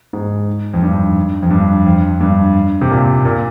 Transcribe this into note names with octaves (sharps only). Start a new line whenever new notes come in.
G#2
F2
G2
F2
G2
F2
G2
C3
A#2
A#2